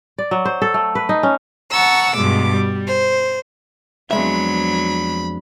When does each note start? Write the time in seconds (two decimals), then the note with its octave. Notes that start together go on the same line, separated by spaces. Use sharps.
0.18 D5
0.31 F#3
0.45 C5
0.62 A4
0.74 A3
0.95 B4
1.09 D#4
1.23 C#4
1.70 F#5 A5 A#5 C#6 E6
2.16 G2 B2 G#3 D6
2.53 G3
2.86 C5
4.11 F2 F#3 G#3 B3 D4 E5 B5